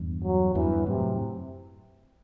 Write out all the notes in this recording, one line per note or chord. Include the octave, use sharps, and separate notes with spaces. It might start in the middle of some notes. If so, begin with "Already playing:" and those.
Already playing: E2 G2
F#3
E2 G2 E3
F#2 A2 C3